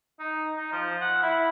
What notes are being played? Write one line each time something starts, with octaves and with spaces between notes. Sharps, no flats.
D#4
D#4
F3
F#5
E4